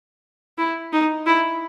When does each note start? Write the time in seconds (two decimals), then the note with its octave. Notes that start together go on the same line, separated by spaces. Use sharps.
0.58 E4
0.93 D#4
1.26 E4